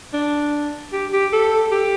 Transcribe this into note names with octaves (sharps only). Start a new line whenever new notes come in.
D4
G4
G4
A4
G4